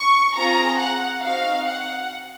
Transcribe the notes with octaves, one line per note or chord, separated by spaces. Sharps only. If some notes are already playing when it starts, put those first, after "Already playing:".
Already playing: C#6
C4 F4 G#4 A#5
F#5
C4 D#4 F#4 F5
F#5